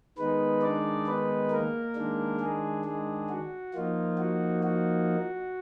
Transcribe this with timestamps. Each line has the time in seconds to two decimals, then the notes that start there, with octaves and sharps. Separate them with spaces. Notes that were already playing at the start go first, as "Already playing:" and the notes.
0.18 D#3 G#3 B3 D#4 B4
0.62 D4 D5
1.07 B3 B4
1.51 A#3 A#4
1.96 D#3 G#3 D4
2.41 G#3 G#4
2.85 G#3 G#4
3.29 F#4
3.74 F3 A#3 D#4 F4
4.18 F#4
4.63 F#4